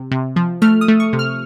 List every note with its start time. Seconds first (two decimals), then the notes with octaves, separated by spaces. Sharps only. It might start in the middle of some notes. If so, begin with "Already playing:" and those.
Already playing: C3
0.11 C3
0.36 F3
0.62 A3 F6
0.81 D#6
0.88 A3
1.00 C#6
1.13 C3
1.19 F6